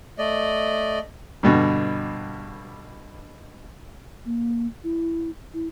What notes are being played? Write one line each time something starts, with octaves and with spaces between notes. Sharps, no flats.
A3 D5 D#5
G2 B2 D3
A#3
E4
E4